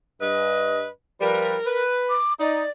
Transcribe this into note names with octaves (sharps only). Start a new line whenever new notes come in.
G2 B4 D#5
F3 G3 A#4 B4
B4
D6
D#4 D5